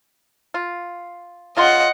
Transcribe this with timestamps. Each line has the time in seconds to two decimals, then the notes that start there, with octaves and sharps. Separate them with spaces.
0.54 F4
1.57 C#3 F4 D#5 F#5 C6